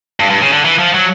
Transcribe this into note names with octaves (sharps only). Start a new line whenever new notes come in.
G2
G2
C#3
D3
E3
F3
F#3